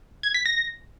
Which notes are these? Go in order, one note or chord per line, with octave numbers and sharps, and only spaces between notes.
G#6
B6
A#6